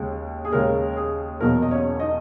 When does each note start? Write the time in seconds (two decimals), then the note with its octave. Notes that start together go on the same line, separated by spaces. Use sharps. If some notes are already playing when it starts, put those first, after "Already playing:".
Already playing: D#2 C#3 G#3
0.45 G#4
0.52 D#2 C#3 G#3 C#4 A#4
0.96 G#4
1.41 E1 E2 B2 F#3 A#3 A#4
1.62 D#5
1.71 C#4 C#5
2.00 D#4 D#5